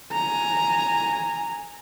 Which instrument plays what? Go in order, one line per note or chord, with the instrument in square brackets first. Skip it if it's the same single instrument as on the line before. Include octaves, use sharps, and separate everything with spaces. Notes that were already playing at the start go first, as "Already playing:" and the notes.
[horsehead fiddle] G#5 A#5